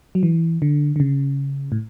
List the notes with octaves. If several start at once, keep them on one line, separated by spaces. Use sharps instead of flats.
F#3
E3
D3
D3
C#3
A2